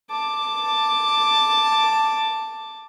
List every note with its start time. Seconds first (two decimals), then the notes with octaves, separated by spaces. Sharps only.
0.10 A5 D6